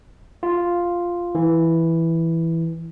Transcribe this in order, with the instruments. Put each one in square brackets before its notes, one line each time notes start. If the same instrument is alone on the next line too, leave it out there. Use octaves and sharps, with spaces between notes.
[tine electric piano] F4
E3